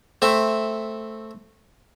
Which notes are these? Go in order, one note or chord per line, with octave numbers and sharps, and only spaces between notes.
A3 C4 E5